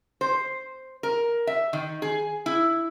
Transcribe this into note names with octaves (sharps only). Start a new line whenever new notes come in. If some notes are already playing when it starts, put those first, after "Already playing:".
C5
A#4
E5
D#3
G#4
E4